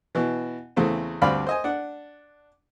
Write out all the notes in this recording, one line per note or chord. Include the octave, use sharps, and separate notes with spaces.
B2 E3
E2 C#3 A3 C4
D2 G2 C4 D5 F5 B5
C5 D#5 G#5
D4 F#5